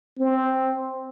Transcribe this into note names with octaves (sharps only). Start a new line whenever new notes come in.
C4